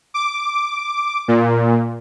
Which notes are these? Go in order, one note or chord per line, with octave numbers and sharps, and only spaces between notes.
D6
A#2